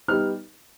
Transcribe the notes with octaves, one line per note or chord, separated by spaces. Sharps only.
G3 B3 D#4 F6